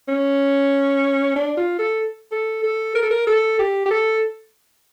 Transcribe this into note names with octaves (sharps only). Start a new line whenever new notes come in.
C#4
D4
F4
A4
A4
A4
A#4
A4
A#4
A4
G4
G4
A4